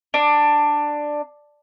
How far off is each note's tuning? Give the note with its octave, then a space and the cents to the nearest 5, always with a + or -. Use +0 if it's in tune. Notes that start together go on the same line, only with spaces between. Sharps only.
D4 +10